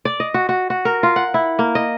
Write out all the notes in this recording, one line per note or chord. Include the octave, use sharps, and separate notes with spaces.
D5
D#5
F#4
F#4
F#4
A#4
F4
F#5
E4
A#3
D#5